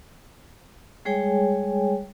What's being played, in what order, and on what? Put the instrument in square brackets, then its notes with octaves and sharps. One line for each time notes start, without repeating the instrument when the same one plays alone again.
[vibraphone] G3 G#3 G#4 C#5 G5 G#5